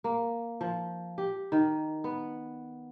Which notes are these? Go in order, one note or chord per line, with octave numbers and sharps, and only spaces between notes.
A#3
F3
G4
D#3
B3